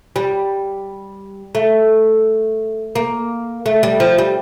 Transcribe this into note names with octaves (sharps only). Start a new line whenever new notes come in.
G3
A3
A#3
A3
G3
F3
G3